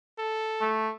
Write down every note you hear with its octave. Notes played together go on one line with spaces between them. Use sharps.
A4
A3